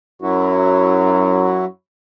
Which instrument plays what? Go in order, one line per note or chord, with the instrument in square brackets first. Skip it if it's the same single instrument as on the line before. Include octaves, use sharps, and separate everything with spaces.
[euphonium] F#2 [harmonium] F#3 E4 F#4